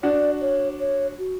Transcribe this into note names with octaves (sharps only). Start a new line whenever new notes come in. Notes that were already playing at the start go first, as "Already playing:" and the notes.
D4 F#4 D5
C#5
C#5
F#4